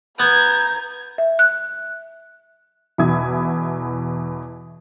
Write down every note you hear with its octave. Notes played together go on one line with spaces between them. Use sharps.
B3 B4 A#5 G6 G#6
E5
F#6
E2 B2 E4 E5 D#6 G#6